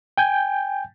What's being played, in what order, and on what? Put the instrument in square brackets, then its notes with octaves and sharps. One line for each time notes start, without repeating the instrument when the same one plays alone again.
[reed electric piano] G5 G#5 G6